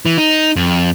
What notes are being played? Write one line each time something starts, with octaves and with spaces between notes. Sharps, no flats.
E3
D#4
F2